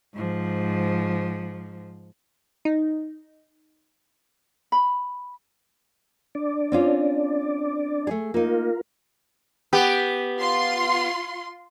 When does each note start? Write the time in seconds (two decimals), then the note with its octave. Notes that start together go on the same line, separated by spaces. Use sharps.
0.14 G#2 F3
2.65 D#4
4.72 B5
6.35 D4 D5
6.72 C4 C#4 F4
8.07 A3 G#4
8.34 A#3 D#4 F4 A#4
9.73 B3 G4
10.41 F4 C6